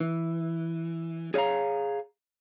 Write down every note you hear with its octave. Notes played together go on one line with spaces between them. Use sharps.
E3
G#4 C#5 D#5 F5 A#5